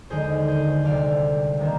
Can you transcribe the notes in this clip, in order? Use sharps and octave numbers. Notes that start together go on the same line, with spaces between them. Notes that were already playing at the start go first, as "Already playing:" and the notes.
D#2 D3 G#3 G#4 C5
G#4 C5
D2 C3 G3 D4 D5 F5
C3 D#3 G3 A#3 D4